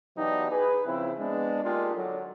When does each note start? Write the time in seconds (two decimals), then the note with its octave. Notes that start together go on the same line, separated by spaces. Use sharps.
0.17 B2 E3 F#3 D4 D#4 G4
0.52 G#4 B4
0.86 C#3 F3 C4 E4
1.18 G#3 B3 D4
1.64 G#3 A#3 D4 D#4 F4 G4
1.95 D3 F#3